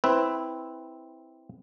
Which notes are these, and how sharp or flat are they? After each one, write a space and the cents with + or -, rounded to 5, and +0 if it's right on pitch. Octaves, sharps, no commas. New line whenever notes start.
C4 +5 E4 -10 B4 +10